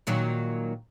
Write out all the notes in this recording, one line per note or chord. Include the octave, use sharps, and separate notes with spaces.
A#2 D#3 F#3